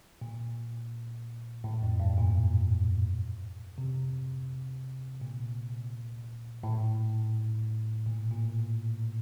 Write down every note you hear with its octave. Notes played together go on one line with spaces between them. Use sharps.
A#2
A2
F2
G2
A#2
C3
A#2
A2
A#2
A2
A#2